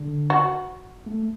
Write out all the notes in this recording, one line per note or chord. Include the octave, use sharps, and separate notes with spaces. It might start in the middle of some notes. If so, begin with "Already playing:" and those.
Already playing: D3
F#4
A3